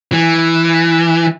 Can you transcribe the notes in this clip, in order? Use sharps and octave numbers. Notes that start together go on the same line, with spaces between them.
E3